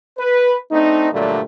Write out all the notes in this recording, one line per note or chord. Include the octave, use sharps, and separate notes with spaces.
B4
A3 C4 D4 D#4
G2 A#2 D3 F#3 G3 A3